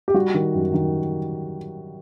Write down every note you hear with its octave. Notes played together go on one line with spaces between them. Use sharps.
G4
G3 F#4
D#3
F#2
D#3